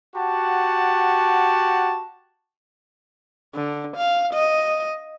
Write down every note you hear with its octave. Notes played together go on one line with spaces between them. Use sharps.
F#4 G4 F#5 A5
D3
F5
D#5